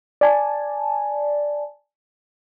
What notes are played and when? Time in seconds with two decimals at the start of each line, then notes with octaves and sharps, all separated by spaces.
0.21 D5 G#5 A5